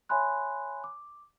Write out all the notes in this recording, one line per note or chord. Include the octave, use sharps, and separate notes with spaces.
C#5 E5 G#5 B5 C6 F#6
D6